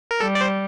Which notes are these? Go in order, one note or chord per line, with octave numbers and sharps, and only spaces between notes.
A#4
G3 A4
D5
C5